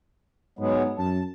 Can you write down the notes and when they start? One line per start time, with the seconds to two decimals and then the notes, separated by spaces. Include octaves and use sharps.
0.59 G#2 F#3 G#3 B3
0.99 F#2 A5